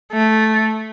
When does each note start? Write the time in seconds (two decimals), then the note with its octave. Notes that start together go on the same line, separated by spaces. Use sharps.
0.12 A3